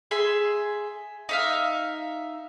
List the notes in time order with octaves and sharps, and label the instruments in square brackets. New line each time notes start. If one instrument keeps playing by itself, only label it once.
[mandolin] G#4 E5 C6
D#4 E5 F5